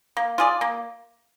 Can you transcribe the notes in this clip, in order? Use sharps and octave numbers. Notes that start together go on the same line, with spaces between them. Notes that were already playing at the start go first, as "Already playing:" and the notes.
A#3
F4 G#4 D5
A#3